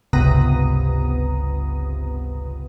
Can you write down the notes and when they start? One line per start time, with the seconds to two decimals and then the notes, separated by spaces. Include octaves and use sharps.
0.13 G1 C#2 C3 B3 A#5 D#6